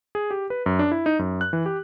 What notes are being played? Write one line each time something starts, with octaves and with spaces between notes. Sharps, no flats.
G#4
G4
B4
F#2
D4
E4
D#4
F#2
F#6
E3
G4